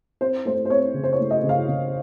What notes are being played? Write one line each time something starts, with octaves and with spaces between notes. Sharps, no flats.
C4 C5
A3 C5
C5
C4 C#5
C#3
C5
C#5
A3
D#5
C#3
F5
C#3